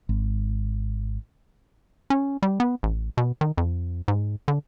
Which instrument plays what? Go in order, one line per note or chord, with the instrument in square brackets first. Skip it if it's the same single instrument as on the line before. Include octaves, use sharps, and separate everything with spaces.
[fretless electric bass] G#1
[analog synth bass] C#4
G3
B3
A1
B2
D#3
F2
G#2
D3